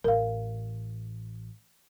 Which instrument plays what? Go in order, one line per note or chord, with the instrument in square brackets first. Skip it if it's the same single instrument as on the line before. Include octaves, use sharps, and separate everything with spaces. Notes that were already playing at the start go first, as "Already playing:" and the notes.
[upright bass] A1 [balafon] A#4 F5